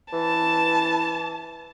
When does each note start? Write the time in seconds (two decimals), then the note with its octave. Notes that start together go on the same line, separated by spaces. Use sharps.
0.13 E3 A5